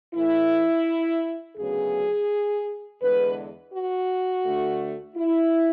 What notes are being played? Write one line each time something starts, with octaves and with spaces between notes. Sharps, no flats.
A2 E3 A3 E4
D2 C#3 F#3 B3 G#4
E2 D3 G#3 B4
F#4
D2 D3 A3
E4